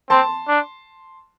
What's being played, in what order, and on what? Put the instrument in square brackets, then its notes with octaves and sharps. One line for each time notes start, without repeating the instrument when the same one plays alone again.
[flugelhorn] C4 [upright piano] A5 C6
[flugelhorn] D4